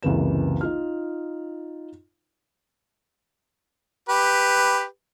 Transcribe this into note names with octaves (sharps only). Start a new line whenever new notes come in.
F#1 C#2 C3 E3 B4 E7
D#4 F4 F6
G4 B4